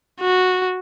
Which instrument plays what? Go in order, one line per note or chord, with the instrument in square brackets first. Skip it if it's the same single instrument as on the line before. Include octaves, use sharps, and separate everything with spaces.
[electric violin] F#4